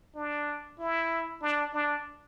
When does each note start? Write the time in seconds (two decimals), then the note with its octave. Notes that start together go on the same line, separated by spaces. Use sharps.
0.15 D4
0.79 E4
1.42 D4
1.74 D4